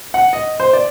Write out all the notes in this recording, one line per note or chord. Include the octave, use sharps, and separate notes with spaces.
F#5
D#5
C5
D5